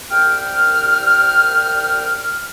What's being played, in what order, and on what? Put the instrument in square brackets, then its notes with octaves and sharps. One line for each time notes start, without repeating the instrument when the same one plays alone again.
[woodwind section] C2 G5 F6